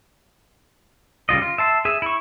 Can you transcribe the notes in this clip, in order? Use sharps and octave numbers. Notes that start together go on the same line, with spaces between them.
C#3 G3 F4 D#5
F4
E5 A5 C6
G#4 E5
E4 C#6